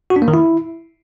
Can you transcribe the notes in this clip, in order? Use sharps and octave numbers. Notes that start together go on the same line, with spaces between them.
F#4
D4
A#3
D#3
E4